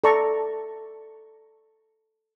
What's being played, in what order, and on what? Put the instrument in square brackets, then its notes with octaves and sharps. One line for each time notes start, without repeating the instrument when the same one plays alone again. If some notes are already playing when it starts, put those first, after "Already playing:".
[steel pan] A4 D5 A5 A#5 C#6